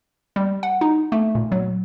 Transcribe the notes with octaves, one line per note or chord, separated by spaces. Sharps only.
G3
F#5
D#4
A3
A#2
F#3